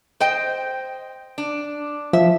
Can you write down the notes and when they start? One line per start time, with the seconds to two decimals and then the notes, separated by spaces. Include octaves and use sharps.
0.20 C5 D#5 G5
1.38 D4
2.13 F3 E5